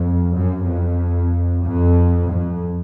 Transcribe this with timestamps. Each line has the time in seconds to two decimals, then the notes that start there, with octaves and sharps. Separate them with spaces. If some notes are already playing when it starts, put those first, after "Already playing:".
Already playing: F2
0.35 F#2
0.68 F2
1.65 F2
2.30 F2